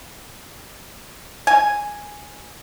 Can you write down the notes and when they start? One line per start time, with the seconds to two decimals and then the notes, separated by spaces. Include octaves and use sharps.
1.47 G#5